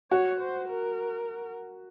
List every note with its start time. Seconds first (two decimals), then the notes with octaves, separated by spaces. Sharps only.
0.11 F#4 C#5
0.40 C5
0.68 A#4